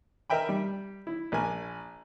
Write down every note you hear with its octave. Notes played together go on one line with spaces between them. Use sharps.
A#4 D#5 E5 G5 B5
G3
E4
A#1 A#3 G#5